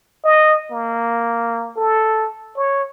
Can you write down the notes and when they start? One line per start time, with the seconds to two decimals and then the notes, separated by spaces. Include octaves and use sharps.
0.24 D#5
0.71 A#3
1.77 A4
2.57 C#5